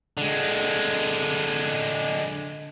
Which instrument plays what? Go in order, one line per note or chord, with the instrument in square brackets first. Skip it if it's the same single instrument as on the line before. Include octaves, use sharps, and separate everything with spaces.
[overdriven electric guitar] D3 G#3